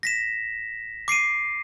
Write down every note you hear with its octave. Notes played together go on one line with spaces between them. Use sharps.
A#6 B6 E7
D6 C7 D7 D#7